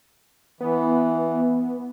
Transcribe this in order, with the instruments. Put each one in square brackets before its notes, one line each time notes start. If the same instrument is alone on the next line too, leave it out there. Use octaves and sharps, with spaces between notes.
[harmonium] E3 [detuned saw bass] B3